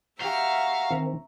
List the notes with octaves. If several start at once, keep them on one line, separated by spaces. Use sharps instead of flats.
F#4 G4 E5 F5 A#5 C#6
D#3 C4